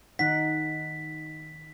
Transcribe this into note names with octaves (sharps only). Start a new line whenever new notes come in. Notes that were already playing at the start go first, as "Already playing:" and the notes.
D#3 D#4 F#5 B6